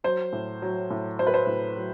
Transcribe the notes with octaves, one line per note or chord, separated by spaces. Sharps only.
F#3 C5
A2
F#3
A2
F#3 C5
B4
C5
A2
F#3